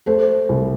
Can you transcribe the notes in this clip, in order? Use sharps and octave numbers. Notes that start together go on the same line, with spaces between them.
A3 A4 C5
C2